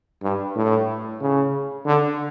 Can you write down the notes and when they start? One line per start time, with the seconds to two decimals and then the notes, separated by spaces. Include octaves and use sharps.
0.22 G2
0.55 A2
1.21 C#3
1.86 D3